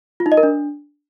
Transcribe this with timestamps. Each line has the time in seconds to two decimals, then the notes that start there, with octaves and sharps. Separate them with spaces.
0.20 F4
0.26 D#4
0.32 D#5
0.37 A#4
0.43 D4